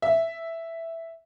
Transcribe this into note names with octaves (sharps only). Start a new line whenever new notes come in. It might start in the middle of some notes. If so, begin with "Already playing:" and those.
E5